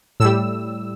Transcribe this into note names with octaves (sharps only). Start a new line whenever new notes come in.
A2 G3 E6